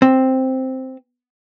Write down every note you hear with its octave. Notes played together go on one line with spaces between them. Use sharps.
C4